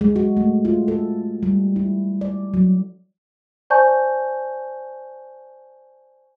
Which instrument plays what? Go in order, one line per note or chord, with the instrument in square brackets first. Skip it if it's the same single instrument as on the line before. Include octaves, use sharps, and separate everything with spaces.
[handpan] G#3
F#4
A3
F4
A4
G3
E4
D5
F#3
[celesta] C5 D5 G#5 A5 C#6 G6